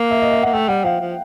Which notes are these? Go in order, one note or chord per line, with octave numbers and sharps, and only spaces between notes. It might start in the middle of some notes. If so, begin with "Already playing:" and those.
Already playing: A#3
E5
D#5
E5
A#3 F#5
A3 G5
G3 F#5
F3 F5
F3